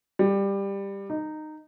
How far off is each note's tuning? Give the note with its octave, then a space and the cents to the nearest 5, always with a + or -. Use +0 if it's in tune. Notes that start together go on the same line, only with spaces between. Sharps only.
G3 +15
D#4 -15